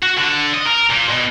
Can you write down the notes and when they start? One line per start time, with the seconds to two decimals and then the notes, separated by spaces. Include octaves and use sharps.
0.03 F#4
0.18 D3
0.54 D#5
0.67 A#4
0.90 A#2
1.09 B2